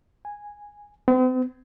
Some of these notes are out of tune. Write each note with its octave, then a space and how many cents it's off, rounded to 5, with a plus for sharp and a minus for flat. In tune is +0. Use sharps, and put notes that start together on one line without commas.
G#5 -10
C4 -45